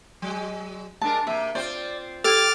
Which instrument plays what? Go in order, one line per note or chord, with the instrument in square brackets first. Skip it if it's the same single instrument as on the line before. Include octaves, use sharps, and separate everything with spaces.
[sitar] F#3 G#3
[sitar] G#3 D4 A#4 [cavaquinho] A5
[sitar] C3 A#3 [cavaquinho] E5
[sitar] C4 F4 C5 [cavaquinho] D5
[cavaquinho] G4 [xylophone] A4 G#6 [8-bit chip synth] D6 F6 A6